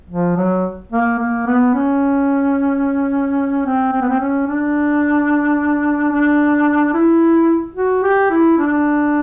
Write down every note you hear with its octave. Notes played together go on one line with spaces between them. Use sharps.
F3
F#3
A#3
A#3
B3
C#4
C4
C4
B3
C4
C#4
D4
D4
E4
F#4
G4
E4
D4